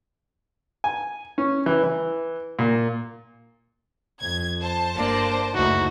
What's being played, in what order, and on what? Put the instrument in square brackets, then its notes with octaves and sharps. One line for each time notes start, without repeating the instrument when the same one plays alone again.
[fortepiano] G#5
C#4
E3
E3
A#2
[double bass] F2 [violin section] G#6
[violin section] C5 A5
[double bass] G1 [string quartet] A#3 D4 D5
[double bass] F#1 D2 [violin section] D#4 [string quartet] E4 [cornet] F#4